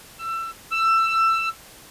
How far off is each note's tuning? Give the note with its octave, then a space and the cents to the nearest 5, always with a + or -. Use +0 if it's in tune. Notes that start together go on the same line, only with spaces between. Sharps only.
E6 +25
E6 +20